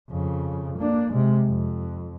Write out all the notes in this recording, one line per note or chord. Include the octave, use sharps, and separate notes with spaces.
F2 C#3
A#3 D4
C3 G#3
F2